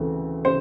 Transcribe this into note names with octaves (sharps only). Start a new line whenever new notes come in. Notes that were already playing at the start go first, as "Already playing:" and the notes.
Already playing: D2 C#3 E3 A3 C4
C#3 C5